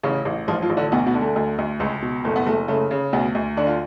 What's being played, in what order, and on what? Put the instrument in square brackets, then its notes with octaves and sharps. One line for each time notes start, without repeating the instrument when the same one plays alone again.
[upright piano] A1 C#3 C#4
A1
A1 F3 F4
F3 F4
A1
D3 D4
D2 B2 B3
B2 B3
D3
A3
D2
D2
C#2
B2
F#1 A3
B3
F#1 A3
C#3 A3
C#3
D2 B2 B3
D2
D3 D4
F4